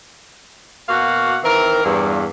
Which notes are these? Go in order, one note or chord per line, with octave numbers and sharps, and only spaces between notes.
B2 A#3 F#4 F5 F#5
D#3 E3 C4 A#4
E2 G2